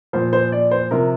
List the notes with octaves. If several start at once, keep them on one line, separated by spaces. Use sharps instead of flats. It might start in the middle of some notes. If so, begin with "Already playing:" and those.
A#2 F3 C5
C5
D5
C5
C3 F3 A#4